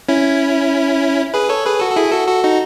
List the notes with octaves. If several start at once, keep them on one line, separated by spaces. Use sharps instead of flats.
C#4 E4
G#4 B4
A4 C#5
G#4 B4
F#4 A4
A4
E4 G#4
F#4 A4
F#4 A4
D#4 F#4